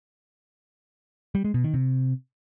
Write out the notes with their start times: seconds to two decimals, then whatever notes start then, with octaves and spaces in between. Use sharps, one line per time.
1.35 G3
1.44 G#3
1.54 B2
1.64 D#3
1.74 C3